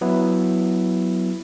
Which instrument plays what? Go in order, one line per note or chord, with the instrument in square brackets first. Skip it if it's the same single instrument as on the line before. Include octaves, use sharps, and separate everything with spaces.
[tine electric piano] F#3 B3 E4